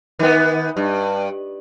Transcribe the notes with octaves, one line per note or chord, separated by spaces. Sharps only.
D#3 B3
G2